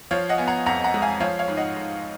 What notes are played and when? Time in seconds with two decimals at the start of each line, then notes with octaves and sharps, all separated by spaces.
0.11 F3 C#5 F5
0.29 D#5 F#5
0.38 B3 G#5
0.48 F#5 A#5
0.66 F2 F#5 A#5
0.84 F#5 A#5
0.94 G#3
1.02 F5 G#5
1.20 F3 C#5 F5
1.39 C#5 F5
1.48 G#2
1.57 D#5 F#5
1.76 G#2